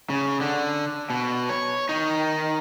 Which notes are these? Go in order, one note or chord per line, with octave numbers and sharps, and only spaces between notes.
C#3
D3
B2
C#5
D#3 D#4